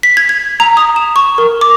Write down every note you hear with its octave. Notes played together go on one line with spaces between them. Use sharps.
B6
G#6
G#6
A#5
D#6
E7
C#6
A#4
D6